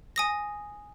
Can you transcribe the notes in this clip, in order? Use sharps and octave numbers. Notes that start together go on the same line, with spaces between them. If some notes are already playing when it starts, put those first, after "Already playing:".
G#5 D#6 A#6